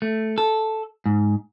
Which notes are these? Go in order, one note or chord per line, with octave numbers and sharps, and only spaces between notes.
A3
A4
G#2